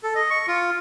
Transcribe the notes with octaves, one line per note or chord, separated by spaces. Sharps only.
A4
D#5
C#6
F4